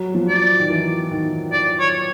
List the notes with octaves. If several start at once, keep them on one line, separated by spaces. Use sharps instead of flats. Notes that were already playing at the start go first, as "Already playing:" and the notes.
Already playing: F#3
F3
D5
D#3
E3
D#3
D5
C#5